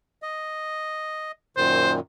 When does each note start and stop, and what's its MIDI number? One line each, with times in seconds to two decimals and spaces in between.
0.22 1.32 75
1.57 2.00 42
1.57 2.00 46
1.57 2.00 51
1.57 1.92 72